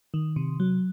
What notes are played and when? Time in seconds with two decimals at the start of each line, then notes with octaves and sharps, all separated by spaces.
0.14 D#3
0.36 C3
0.60 F#3